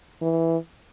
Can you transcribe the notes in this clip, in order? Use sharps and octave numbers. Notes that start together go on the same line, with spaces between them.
E3